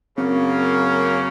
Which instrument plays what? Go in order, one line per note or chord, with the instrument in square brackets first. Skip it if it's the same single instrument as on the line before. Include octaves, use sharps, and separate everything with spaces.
[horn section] F#2 C#3 F#3 A#3 C#4 [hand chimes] C4